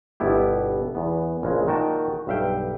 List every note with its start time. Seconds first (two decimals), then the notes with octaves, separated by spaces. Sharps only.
0.20 G1 B2 B3 E4 G4
0.95 E2 B3
1.43 A#1 C#3 G#3
1.67 A#2 D#3 F#4 G5 A5
2.27 B1 G2 E5 F5 G5